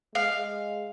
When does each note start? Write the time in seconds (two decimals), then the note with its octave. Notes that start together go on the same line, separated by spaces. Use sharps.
0.15 G#3 F5